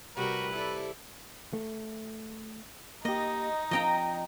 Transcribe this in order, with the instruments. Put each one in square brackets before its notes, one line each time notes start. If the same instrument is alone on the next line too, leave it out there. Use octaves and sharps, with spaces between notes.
[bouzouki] C3 [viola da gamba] G3 F#4 A#4 [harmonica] B4
[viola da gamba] E4 A4 D5
[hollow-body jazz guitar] A3
[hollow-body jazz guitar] A#3 G4 [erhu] D#4 [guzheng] D#5
[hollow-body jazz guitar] F3 C4 D4 [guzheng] D#5 G5 A#5